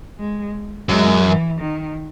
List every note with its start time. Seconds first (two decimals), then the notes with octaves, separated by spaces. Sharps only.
0.18 G#3
0.89 F#2 G#3
1.25 E3
1.61 D#3